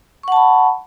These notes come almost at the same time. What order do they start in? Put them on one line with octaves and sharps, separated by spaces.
C#6 F#5 A5 B5